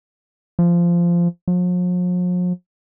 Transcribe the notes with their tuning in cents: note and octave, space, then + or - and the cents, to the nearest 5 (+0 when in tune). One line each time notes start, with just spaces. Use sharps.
F3 -15
F3 +45